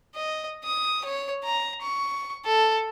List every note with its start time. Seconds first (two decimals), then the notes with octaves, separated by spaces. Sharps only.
0.15 D#5
0.65 D#6
1.05 C#5
1.44 A#5
1.82 C#6
2.45 A4